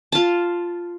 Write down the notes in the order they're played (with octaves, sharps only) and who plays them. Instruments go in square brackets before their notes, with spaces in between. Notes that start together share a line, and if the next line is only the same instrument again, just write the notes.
[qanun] F4 A5